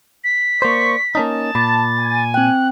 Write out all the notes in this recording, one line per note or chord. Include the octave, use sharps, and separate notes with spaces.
B6
A#3 C5 D5 C#6
A#3 C#4 D#4 A5 D#6
A#2 B5 D6 A6
G#5
C4 G5 F#6